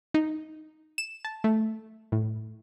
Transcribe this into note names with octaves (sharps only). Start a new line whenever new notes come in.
D#4
E7
A5
A3
A2